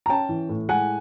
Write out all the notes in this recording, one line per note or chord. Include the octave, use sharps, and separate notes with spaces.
A#5
C#4 G5 A5
E3
A2
G#3 F#5 G#5